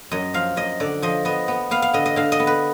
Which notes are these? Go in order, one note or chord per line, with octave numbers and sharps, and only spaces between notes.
F#2 D#5
F3 F5
F#2 D#5
D3 D5
F3 D#5
B3 D#5
B3
B3 F5
F5
D3 D#5
D#5
D3 F5
D#5
B3
B4